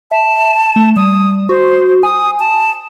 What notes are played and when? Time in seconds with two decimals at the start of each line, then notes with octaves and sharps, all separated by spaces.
0.11 E5 A5
0.76 A3
0.96 G3 D#6
1.49 F#4 C5
2.03 G#5 D#6
2.40 A5